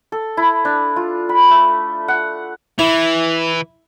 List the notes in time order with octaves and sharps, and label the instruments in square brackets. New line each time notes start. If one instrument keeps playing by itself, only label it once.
[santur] A4
E4
D4
F4
B5
A3
F#5
[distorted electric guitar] E3 [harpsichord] E4